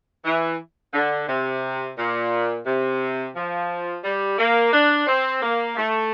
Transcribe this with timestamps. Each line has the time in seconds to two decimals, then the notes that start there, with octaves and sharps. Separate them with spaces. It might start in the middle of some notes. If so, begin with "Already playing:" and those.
0.24 E3
0.93 D3
1.28 C3
1.98 A#2
2.66 C3
3.35 F3
4.04 G3
4.38 A#3
4.73 D4
5.07 C4
5.42 A#3
5.77 A3